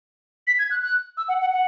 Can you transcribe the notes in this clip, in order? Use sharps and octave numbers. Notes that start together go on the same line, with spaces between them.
B6
G#6
F#6
F#6
E6
F#5
F#5
F#5